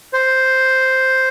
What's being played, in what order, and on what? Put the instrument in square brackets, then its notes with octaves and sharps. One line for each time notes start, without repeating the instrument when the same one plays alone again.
[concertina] C5